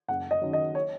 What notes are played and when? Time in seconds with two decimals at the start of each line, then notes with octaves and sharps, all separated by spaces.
0.08 F#1 F#5
0.31 D#5
0.42 F#2 D#3 F#3
0.53 D#5
0.75 C#5